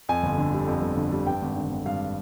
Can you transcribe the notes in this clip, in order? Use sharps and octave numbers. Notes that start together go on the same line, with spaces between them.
F2 G#5
G1
D3
G3
F2
G1
D3
G3
G2 G5
G#1
D3
G#1
G2 F5